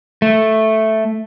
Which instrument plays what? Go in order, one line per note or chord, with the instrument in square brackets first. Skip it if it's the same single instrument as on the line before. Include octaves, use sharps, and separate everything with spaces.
[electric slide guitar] A3